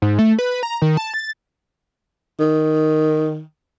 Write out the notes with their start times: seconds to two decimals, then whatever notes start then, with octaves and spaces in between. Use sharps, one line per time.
0.02 G#2
0.19 A3
0.39 B4
0.63 A#5
0.82 D#3
0.97 A5
1.14 A6
2.40 D#3